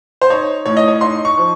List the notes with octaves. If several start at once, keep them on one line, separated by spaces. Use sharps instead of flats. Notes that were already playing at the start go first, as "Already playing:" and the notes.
C5
D#4 C#5
A2 C#5
D#5
C#5
D#4 C6
C#6
F3